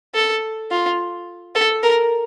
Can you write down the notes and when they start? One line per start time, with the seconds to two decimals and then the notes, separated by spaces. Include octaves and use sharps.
0.15 A4
0.71 F4
1.55 A4
1.83 A#4